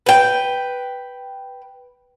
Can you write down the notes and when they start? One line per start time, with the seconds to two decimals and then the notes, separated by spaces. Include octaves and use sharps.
0.06 B4 G5